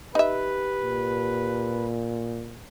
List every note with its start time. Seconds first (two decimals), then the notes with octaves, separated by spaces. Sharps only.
0.15 D#4 G4 B4 E5
0.79 A#2